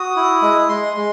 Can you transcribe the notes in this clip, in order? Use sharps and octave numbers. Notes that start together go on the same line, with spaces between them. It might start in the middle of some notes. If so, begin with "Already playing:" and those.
Already playing: F#4 D#6
E4
G#3
G#3 C6
G#3